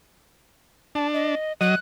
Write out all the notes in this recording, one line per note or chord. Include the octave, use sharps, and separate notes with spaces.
D4 A5
D#5
F#3 D#5 F#6